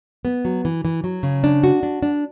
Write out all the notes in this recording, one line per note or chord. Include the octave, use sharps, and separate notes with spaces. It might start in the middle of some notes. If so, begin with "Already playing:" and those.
B3
F#3
E3
E3
F#3
C#3
D4
F#4
D4
D4